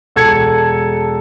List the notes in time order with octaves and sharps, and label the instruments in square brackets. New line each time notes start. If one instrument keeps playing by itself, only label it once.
[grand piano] E1 A4 G#6 C#7